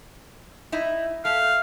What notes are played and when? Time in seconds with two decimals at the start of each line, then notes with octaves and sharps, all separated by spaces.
0.72 D#4 E4
1.25 A3 F5